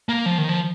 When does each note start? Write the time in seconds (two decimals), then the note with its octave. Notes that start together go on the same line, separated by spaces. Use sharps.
0.09 A#3
0.26 F3
0.38 D#3
0.49 F3